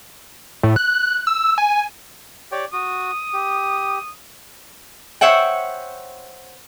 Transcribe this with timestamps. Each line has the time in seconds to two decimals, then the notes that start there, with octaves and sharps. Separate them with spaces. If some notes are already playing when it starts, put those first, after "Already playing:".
0.63 A2
0.76 F#6
1.27 E6
1.58 G#5
2.52 G4 C#5 D5 G5
2.73 F#4 D#6
3.33 G4
5.21 C5 C#5 E5 F#5 G5